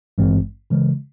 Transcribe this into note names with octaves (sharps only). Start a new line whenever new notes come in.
G#1 G2 E3 G#3 C4
C#3 E3 G#3